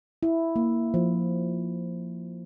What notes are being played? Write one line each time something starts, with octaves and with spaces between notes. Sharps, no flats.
E4
A#3
F3